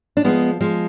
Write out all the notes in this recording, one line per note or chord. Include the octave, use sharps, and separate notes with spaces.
D4
F3 G#3 B3
F3 G#3